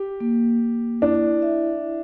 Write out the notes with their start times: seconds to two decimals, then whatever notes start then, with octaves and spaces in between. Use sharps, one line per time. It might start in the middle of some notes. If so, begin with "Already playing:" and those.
Already playing: G4
0.20 A#3
0.60 A#3
1.01 D4 E4
1.42 E5
1.82 E4